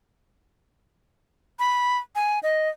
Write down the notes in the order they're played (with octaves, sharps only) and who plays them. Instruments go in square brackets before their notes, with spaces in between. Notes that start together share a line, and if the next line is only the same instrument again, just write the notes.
[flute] B5
G#5
D#5